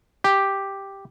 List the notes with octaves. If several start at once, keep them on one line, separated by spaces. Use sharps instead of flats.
G4